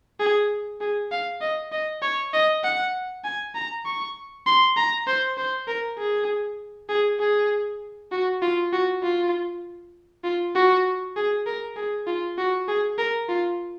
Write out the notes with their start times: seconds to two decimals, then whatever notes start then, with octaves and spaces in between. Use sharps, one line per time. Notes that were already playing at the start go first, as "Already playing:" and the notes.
0.20 G#4
0.81 G#4
1.12 F5
1.41 D#5
1.72 D#5
2.02 C#5
2.33 D#5
2.64 F#5
3.24 G#5
3.55 A#5
3.86 C#6
4.46 C6
4.77 A#5
5.07 C5
5.37 C5
5.68 A#4
5.98 G#4
6.89 G#4
7.20 G#4
8.12 F#4
8.42 F4
8.73 F#4
9.03 F4
10.24 F4
10.55 F#4
11.16 G#4
11.46 A#4
11.76 G#4
12.07 F4
12.38 F#4
12.68 G#4
12.98 A#4
13.29 F4